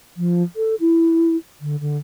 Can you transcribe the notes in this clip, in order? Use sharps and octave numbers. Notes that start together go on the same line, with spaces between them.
F3
A4
E4
D3
D3